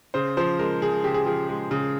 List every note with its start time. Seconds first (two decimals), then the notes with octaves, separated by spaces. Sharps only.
0.14 C#3 C5
0.37 F3 C5
0.59 G#3 A#4
0.81 C#3 G#4
1.04 C#3 G4
1.14 G#4
1.25 F3 G4
1.49 G#3
1.71 C#3